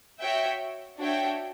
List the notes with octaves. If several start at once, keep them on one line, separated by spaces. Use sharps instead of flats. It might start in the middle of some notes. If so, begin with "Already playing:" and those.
F#4 C#5 E5 G5
D4 F#4 C#5 E5 G5